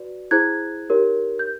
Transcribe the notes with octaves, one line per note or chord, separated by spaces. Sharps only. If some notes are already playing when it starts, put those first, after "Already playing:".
Already playing: F#4 B4 D5
E4 G#4 C5 F#6 G#6
D#4 G4 A#4 C#5
G6